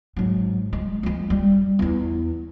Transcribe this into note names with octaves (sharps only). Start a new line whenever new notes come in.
G#2 F#3
G#3
F2 G#3
G3
E2 E4